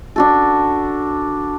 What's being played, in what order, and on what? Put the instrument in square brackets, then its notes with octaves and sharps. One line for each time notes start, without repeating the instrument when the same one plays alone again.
[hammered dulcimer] D4 F#4 A4